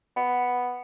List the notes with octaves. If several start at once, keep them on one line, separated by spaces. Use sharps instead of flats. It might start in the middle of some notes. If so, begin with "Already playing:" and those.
B3